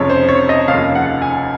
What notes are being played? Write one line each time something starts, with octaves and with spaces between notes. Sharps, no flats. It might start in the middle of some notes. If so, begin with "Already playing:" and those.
Already playing: F1 F2 C#3 F3 C#5
C5
C#5
D#5
F1 D#2 C#3 F3 F5
F#5
G#5